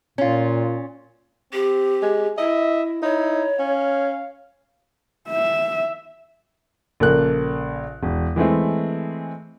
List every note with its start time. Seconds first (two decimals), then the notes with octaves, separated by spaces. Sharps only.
0.18 A#2 C#4 F4
1.53 C4 G4
2.03 G#3
2.38 E4 D#5 E5
3.03 D#4 E4 C#5
3.59 C#4 F5
5.29 E5
7.00 A#1 C#3 A#3 A4 A#4 F#6
8.03 E1
8.36 E3 G#3 A3 C4